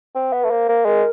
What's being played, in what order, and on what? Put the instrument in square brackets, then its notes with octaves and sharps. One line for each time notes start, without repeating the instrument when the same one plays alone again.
[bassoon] C4
B3
[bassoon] A3 [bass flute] B4
[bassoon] A#3 [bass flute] C5
[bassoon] A#3
[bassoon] G#3 [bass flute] A#4